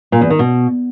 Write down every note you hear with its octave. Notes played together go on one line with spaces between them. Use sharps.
A#2
E2
D#3
B2